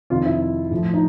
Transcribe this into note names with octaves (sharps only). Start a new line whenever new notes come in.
F2 C3 D#3 F4
E4
A2 F3
D#4